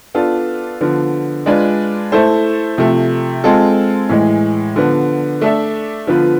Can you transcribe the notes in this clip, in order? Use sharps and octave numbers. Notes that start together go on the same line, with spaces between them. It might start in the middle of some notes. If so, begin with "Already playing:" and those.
B3 D4 F4 A4
D3 F3 B3
G#3 D4 F4 B4
A3 E4 A4 C5
C3 F3 A3
G#3 C4 F4 A4
A2 E3 G#3
D3 F3 B3
A3 D4 A4 E5
D3 F3 B3 F4 B4